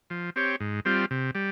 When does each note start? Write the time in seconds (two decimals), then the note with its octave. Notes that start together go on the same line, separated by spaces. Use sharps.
0.10 F3
0.36 C4 G4 C#5
0.60 G#2
0.85 G3 C4 F4
1.11 C3
1.35 G3